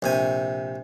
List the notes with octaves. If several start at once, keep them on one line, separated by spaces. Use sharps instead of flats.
A#1 C3 G#5